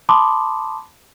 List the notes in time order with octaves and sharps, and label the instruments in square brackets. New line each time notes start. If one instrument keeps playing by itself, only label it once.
[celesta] A5 B5 C6 D6 D#6